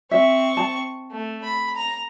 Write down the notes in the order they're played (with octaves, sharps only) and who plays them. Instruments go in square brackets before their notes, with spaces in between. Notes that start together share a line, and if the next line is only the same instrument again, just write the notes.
[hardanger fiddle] C4 C#6 [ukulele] E5
[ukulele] A5
[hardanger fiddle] A3
B5
A#5